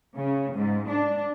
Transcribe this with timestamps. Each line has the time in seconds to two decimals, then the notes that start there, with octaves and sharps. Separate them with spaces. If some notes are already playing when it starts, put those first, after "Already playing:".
0.17 C#3
0.55 G#2
0.88 D4